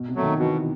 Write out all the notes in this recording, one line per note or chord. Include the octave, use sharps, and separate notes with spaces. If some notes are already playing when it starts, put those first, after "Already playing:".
Already playing: B2
C3
F#3 A3
D#3
B2 E3